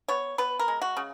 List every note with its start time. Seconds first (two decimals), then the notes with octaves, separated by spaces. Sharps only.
0.08 B3 C#5
0.38 B3 B4
0.59 A#4
0.68 G#3
0.82 F#4
0.97 C#3